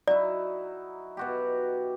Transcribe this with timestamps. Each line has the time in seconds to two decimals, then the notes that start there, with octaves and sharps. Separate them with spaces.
0.08 F#3 D#4 E4 D5
1.17 B2 F#4 G4